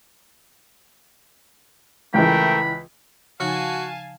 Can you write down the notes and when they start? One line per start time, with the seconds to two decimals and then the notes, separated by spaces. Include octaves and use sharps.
2.14 C#2 E3 A3 A#4 G5 B5
3.40 C#3 F3 D#4 F#4 F5 G#5 A5